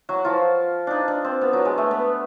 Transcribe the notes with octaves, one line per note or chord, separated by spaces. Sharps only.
F#3 F#4
F3 F4
D4 D#4
D4
C4
B3
F#3
G#3
A3
B3